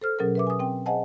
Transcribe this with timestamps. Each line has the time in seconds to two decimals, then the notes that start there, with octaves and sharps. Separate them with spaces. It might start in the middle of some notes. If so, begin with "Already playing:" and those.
0.02 A4 C5 F6
0.19 B2 F#3 C#4 G#4 A#4
0.35 B4 E5 D6
0.47 G#5 D#6
0.60 C4 G5
0.86 G#4 C5 D#5 F#5 G#5 A5